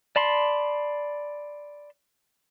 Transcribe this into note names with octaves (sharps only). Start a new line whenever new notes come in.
D5 A5 B5 C6